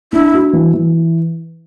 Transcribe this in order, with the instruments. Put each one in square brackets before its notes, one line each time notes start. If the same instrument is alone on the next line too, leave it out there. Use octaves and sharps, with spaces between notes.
[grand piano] D4 [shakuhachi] E4
[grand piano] F#4
E3
E3